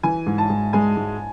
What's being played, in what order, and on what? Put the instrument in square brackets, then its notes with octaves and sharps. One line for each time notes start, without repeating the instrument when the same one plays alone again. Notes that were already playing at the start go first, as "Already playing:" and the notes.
[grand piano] E3 [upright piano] G#5
[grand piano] G#2
[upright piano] A5
[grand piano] G#2
[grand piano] G#3 [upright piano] G#5
[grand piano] G#2